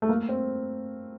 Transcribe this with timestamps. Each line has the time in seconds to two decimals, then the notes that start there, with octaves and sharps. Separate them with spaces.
0.02 A3
0.09 A#3
0.29 C4